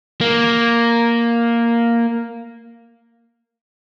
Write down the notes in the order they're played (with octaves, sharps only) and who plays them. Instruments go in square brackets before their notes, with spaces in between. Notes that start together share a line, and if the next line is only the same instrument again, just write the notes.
[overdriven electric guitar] A#3